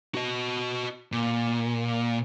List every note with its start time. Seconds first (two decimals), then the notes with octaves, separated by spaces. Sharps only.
0.15 F#4 D#5
1.12 A#2